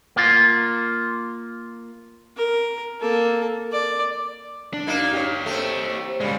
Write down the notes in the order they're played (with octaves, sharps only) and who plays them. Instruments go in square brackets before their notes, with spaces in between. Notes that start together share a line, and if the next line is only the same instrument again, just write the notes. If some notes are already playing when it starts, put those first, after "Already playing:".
[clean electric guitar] A#3 F4
[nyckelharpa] A#4
A#3 A4
D5
[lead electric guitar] D4
[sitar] F#2 A#3 D#4
[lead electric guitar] G4 C#5
[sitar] A3 C4
[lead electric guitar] G2 G#3 [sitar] C#3 G3